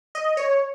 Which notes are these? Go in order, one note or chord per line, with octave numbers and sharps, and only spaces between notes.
D#5
C#5